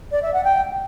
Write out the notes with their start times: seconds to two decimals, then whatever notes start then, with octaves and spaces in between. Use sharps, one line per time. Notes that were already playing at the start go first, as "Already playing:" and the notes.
0.11 D5
0.22 E5
0.33 F#5
0.44 G5